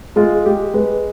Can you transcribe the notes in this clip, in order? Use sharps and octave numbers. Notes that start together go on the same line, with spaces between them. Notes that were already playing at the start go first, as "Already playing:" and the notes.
G#3 F4
G#3 G4
G#3 B4